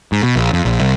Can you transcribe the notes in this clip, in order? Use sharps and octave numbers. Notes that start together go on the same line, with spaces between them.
G#2
B2
A#1
F2
A#1
C2